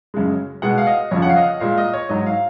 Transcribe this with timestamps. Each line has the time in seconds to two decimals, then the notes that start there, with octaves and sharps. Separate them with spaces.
0.14 F#2 C#3 G#3
0.62 B2 G#3 F#5
0.78 F5
0.87 D#5
1.11 F2 C#3 F3 C#5
1.22 F#5
1.29 F5
1.36 D#5
1.60 A#2 G#3 F5
1.78 D#5
1.94 C#5
2.09 G#2 F#3 D#5
2.26 F5